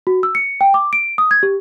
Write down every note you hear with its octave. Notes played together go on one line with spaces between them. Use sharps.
F#4
E6
C#7
G5
D6
D7
D#6
G#6
G4